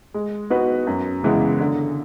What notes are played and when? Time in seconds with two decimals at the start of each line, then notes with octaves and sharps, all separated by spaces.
0.14 G#3
0.50 B3 D#4 F#4 B4
0.87 F#2
1.23 C#3 E3 G#3 B3
1.60 D3